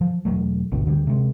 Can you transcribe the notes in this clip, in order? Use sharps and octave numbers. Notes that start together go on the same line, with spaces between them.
F3
E1 D#2 F#3 A3
G#1 D2 B2 D3
D2 D3 F#3 G3
C3 G#3